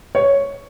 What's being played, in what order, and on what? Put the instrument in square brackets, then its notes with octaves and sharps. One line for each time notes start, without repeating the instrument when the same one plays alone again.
[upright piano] C#5